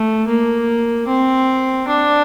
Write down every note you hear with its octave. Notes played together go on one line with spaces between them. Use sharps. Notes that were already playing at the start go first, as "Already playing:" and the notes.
Already playing: A3
A#3
C4
D4